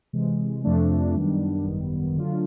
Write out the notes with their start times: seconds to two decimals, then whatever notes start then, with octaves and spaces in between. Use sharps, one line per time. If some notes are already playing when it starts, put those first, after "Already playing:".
0.13 C3 E3 G#3
0.64 F2 C3 F3 A3 D4
1.15 F#2 D#3 G3 B3 D4
1.65 G#1 F#2 D#3 G3 B3
2.15 D3 F#3 A3 D4 F4